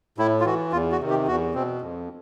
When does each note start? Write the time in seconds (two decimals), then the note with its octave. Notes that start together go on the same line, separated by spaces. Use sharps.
0.18 A2 E4
0.40 F4
0.45 E3 F#4
0.72 E2 F4
0.92 F#4
1.00 C3 D#3
1.10 G4
1.28 E2 F#4
1.54 B2 C4
1.82 F2